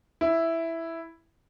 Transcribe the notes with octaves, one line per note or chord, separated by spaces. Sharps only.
E4